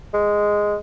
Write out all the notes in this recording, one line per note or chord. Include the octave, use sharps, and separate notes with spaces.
G#3